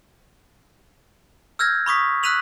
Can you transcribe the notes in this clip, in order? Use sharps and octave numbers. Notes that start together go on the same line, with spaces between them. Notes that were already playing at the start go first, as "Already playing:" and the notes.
E6 F6 G6 G#6 A#6
B5 C#6 D#6 B6
E6 F#6 B6 D#7 F7 F#7